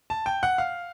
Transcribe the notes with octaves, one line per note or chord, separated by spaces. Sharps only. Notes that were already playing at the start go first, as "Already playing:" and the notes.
A5
G5
F#5
F5